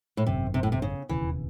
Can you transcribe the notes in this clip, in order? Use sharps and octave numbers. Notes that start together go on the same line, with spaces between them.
A2
G#1 F#2 C3 D#3
C3
A2
C3
C#3
E1 D#2 C#3 E3